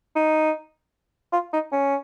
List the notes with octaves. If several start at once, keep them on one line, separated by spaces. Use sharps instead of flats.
D#4
F4
D#4
C#4